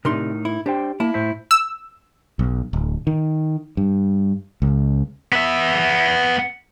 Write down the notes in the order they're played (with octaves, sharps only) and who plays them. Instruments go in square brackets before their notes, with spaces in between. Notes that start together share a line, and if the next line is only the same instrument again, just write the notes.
[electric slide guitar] A2 D#4 A#4 [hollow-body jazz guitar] C3 D4 C6
[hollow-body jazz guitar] E4
[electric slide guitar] D4 C5 G5 [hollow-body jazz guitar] G4
[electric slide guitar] A#3 [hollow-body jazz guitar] E4 A5
[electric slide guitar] A2 C5 E5
[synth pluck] E6
[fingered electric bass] B1
D1
D#3
G2
C#2
[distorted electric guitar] B3 E5